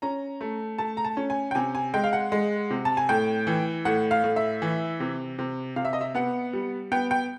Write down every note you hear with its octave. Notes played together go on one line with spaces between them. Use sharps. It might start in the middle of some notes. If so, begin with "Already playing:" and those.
C#4 A#5
A3
A3 A5
A#5
A5
C#4
G#5
G5
C3 G#5
G#5
G#3 G5
F5
F#5
G#3
C3
A5
G#5
A2 G5
E3
A2 F#5
F5
A2
E5
E3
C3
C3
C3 F5
E5
D#5
E5
B3 F#5
G3
B3 G5
G5